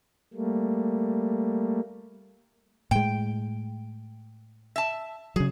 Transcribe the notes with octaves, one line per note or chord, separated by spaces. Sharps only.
G3 A3 A#3
A2 G#3 G5
E5 A5
C#3 F#3 G#4